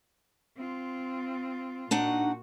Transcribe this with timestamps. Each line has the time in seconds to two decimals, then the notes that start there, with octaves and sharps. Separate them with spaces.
0.56 C4 F4
1.91 A#2 D4 D#4 F#4 F#5